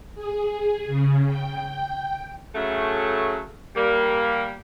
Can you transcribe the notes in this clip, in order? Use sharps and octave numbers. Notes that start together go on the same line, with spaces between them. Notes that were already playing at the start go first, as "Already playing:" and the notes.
G#4
C#3
G5
C#3 F#3 A3
G3 A#3